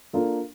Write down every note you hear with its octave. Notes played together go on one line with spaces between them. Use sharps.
A#3 D4 F4 A4